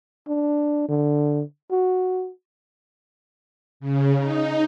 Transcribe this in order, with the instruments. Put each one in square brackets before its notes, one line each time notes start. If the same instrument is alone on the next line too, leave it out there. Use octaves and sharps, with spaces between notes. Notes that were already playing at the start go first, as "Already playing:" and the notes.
[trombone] D4
D3
F#4
[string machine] C#3
D#4